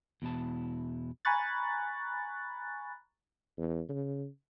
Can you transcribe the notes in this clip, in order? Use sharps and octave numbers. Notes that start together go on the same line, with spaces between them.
E2 B2 E4 A5
G#5 A#5 B5 C#6 F#6 A6
E2
C#3